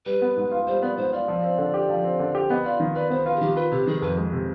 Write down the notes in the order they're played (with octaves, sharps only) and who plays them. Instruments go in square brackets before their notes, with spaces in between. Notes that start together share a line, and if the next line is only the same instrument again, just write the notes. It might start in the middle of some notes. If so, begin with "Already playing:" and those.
[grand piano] G3 [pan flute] B4
[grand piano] B3
G#2
F4
[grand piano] G3 [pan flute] C5
[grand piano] B3 [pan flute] D5
[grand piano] G#2 [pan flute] C5
[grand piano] F4 [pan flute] D5
[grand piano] F3
C4
D3
G4
F3
C4
D3
G4
[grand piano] B3 [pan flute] D#5
[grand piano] F4 [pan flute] D5
[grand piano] D#3
[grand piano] B4 [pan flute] D5
[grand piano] B3 [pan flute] C5
[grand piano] F4 [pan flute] B4
[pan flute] G#4
[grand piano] D#3 [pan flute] G4
[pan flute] F4 [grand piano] B4
[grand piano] C3 [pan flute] G4
[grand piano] D#3 [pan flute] G#4
[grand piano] F2 [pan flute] B4
[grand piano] G#3
C3